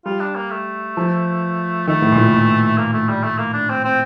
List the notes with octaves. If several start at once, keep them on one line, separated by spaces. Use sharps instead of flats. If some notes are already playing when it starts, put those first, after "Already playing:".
G3 F4
D4
A#3
A3
F3
D#3 A3
A2
A#2
A2
A#2
A#3
A3
G3
A3
A#3
D4
C4
C4